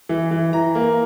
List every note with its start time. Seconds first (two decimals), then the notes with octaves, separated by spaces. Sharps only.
0.09 E3
0.31 E3
0.53 E3 A#5
0.75 A#3